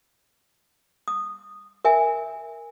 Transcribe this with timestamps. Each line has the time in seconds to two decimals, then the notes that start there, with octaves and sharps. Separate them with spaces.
1.08 D#6
1.85 A#4 E5 G#5